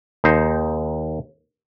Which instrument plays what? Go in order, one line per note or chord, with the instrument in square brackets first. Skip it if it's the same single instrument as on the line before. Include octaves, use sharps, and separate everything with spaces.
[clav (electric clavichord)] D#2 D#4 C5